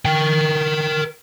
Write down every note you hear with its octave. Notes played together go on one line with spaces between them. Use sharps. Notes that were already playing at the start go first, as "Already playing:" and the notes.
A#4 G5